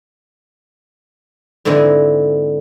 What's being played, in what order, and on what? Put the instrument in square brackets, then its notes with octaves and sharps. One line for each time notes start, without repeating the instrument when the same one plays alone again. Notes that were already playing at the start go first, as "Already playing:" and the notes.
[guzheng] G#2 D3 E3 G#3 C4 E4